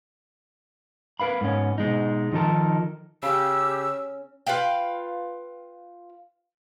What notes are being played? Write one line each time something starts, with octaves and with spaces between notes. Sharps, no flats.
A#4 B4 F5 B5
G#2 B3 C#4
B2 G#3 D#4
D#3 F3 D#4 A4 A#4
C#3 G4 E6
F4 B4 F5 G5